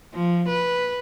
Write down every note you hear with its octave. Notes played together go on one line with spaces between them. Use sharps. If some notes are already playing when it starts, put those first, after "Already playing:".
F3
B4